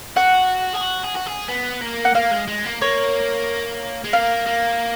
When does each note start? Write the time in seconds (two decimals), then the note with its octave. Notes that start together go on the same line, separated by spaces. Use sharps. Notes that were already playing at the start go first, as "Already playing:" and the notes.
0.16 F#4 F#5
0.75 G#4
0.83 F#4
1.04 G#4
1.16 F#4
1.27 G#4
1.49 B3
1.81 A#3
2.05 F#5
2.15 A#3 F5
2.31 G#3
2.48 G#3
2.65 A#3
2.81 A#3 C#5
4.04 G#3
4.13 A#3 F5
4.47 A#3